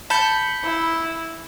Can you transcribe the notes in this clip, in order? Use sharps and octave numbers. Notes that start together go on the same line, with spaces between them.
A5 B5 G6 C#7
E4